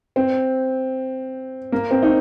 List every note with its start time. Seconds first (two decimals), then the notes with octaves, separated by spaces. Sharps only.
0.16 C4
1.72 A#3
1.91 C4
2.02 D#4